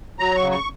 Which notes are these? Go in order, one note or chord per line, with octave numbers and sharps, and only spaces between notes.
F#3 A#5
C#6
C#3
C#6